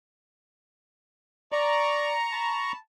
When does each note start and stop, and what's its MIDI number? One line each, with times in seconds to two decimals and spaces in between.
1.52 2.15 74
1.52 2.72 82
1.52 2.72 85
2.32 2.76 81
2.32 2.76 83